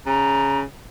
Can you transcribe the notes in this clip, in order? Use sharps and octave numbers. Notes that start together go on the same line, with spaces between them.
C#3 A#5